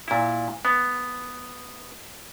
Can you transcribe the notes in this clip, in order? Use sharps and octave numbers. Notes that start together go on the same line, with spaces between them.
A#2 E4
B3